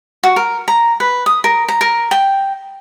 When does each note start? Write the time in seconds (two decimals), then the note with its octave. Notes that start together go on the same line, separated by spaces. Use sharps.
0.24 F#4
0.36 A#4
0.68 A#5
1.00 B4
1.26 D#6
1.44 A#4
1.68 A#5
1.81 A#4
2.11 G5